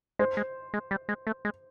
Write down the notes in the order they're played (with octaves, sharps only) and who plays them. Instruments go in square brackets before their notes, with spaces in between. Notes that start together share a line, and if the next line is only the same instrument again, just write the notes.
[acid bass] G#3 [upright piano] C5
[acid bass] G#3
G#3
G3
G#3
A3
G#3